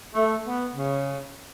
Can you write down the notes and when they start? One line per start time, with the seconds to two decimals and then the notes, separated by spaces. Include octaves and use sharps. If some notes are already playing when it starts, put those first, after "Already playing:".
0.15 A3
0.45 B3
0.75 C#3